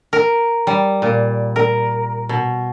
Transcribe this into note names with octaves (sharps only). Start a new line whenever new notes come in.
A#4
G3
A#2
A#4
B2